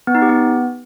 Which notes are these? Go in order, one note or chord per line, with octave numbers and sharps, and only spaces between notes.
B3
D#4
G4
B3